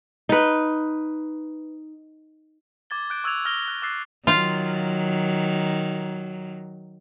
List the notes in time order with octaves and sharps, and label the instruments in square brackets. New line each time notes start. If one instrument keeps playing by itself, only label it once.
[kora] D#4 B4
[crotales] D6 G#6 A6 G7
F#6 G6 D7
C#6 E6 F#6 G#6 F7
F6 G#6 A#6 D7 F7 G7
F#6
D6 E6 F#6 A6 C7
[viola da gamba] D#3 F#3 [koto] F4